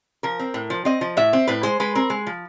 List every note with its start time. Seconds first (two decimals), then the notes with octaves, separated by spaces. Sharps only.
0.23 F3 A#4
0.39 C4
0.54 A2
0.70 F3
0.85 C4 D#5
1.01 F3
1.17 A2 E5
1.33 C4
1.47 A2 B4
1.63 G#3 C5
1.80 G#3 B4
1.95 C4 A#4
2.10 G#3
2.27 F3